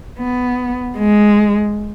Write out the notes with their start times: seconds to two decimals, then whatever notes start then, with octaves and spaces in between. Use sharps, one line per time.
0.19 B3
0.98 G#3